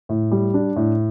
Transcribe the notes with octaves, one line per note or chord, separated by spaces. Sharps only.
A2
G3
D4
A2